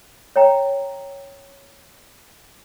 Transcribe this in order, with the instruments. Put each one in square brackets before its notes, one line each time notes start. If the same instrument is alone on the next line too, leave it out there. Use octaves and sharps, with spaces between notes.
[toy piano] C#5 E5 G5 A#5